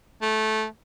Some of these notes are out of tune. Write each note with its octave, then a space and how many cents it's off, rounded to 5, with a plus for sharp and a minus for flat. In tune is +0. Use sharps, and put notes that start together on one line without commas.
A3 -15